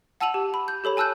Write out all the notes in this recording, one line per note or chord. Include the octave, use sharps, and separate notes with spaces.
F#5 A5 E6 D#7 F7 F#7
G4
B5
G6
G4 A4 C#5 B5
G#5 A5 E6 F#6 G6